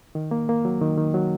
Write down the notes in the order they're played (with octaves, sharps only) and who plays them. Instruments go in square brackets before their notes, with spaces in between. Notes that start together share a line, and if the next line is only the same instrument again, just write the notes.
[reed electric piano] D#3
A#3
A#3
F#3
D#3
D#3
F#3